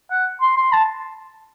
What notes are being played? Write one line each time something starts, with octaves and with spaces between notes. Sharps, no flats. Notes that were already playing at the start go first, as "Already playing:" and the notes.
F#5
C6
C6
A5